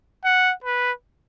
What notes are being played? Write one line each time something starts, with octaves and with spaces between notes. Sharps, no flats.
F#5
B4